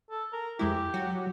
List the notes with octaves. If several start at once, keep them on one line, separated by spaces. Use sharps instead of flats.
A4
A#4
F2 G#3 E4 G4
F#3 F#4